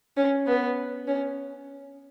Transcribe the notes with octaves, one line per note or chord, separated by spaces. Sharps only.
C#4
B3
C#4